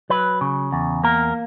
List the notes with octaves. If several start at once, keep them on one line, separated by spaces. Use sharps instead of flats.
F#3 B4
C#3
E2
A#3 A#4